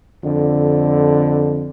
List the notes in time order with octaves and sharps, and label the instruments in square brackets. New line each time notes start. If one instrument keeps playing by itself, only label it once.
[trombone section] F2 D3